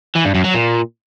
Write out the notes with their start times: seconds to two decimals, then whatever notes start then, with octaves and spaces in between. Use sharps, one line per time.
0.15 E3
0.25 G2
0.35 F#2
0.44 F#3
0.54 A#2